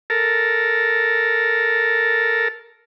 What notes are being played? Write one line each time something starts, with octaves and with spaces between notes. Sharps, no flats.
A4 A#4